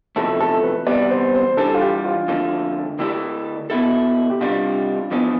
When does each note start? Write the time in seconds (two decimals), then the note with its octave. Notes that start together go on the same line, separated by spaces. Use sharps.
0.16 E2 C3 F3 A3 E4 A4
0.40 A4
0.63 B4
0.87 E2 C3 G3 B3 D5
1.10 C5
1.35 C5
1.57 E3 G3 D4 A4
1.74 F4
1.81 G4
2.05 F4
2.28 F2 D3 A3
2.99 D3 A3 E4 G4 A4 D5
3.70 B2 B3 E4 A4
4.30 G4
4.41 C3 G3 D4 F4
5.11 F2 E3 B3 D4